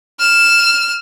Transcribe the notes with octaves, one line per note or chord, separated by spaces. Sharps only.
F6 E7